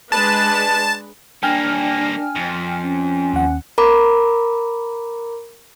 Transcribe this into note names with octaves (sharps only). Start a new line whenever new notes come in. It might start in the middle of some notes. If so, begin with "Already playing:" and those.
G#3 D4 B4 A5
G3 A#3 D4 G5 G#5 F6
F2
C#4
D#2 F#5
A#4 A#5 B5 D6